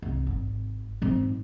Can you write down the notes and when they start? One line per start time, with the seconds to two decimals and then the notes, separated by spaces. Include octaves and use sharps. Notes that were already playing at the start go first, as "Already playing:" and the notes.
0.02 C2
0.27 G#1
1.02 G#2 C4